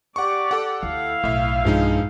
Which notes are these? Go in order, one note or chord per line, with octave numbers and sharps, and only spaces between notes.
G4 D5 F#5 C#6
A4 F#5
D2 E4 F5
B1 A2 E5
G2 F3 G#3 D#4